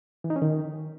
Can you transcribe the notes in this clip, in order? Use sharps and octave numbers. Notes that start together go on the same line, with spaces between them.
E3
D#4
C#4
D#3